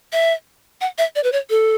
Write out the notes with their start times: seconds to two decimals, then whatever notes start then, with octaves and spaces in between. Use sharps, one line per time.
0.13 E5
0.81 F#5
0.98 E5
1.15 D5
1.24 B4
1.32 C#5
1.50 A4